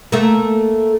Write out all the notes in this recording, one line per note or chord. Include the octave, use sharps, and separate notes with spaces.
A3 A#3